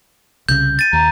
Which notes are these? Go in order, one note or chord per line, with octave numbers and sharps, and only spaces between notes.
C2 C#3 G6
A6 D#7
D#2 A#5